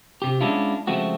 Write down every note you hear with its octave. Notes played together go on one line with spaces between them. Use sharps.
C3 G4
G#3 B3 C#4 D4 E4 F4
C#3 F3 G#3 A3 C4 F#4